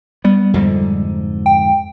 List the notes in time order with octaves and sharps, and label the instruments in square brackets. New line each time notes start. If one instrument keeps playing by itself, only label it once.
[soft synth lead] G3 [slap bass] B3
[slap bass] F2 G#2 D3
[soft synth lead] G5